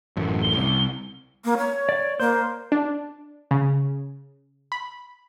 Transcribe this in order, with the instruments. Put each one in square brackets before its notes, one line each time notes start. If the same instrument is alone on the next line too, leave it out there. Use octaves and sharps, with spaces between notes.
[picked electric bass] A1 F#2 A2
[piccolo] G7
[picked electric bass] C2
[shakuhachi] A#3
C#5
[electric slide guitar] D5
[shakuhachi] A#3 [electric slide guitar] C5
[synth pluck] D4
C#3
B5